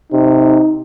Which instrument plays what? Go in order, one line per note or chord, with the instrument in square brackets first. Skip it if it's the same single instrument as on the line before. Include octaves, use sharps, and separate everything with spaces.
[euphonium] C3 [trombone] D#4